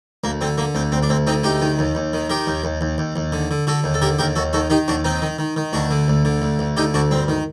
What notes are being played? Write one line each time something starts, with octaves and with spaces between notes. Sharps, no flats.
D2 A#3
D3 C4
D3 A#3
D2 C4
D2 C4
D4
D2 C4
D3 C4 D#4
D2 D#4 G4
D#3
D#2
D#2
D#3
D#3 G4 A#4
D#2
D#2
D#2
D#2
D#2
D3
D3
D3 F#4 A4
D#2
A4
D3 G4 A#4
D#2 G4 A#4
D#2 F#4 A4
D#3 F#4 A4
D#3 D#4 G4
D#2 D4 F#4
D#3 C4 D#4
D#3
D#3
D#3
D2 D4 F#4
D3
D2
D3
D2
D2
D3 D#4 G4
D2 D4 F#4
G2 C4
D#3